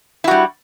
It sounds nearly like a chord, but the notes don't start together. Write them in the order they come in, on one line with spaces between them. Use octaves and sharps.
E4 F#4 G3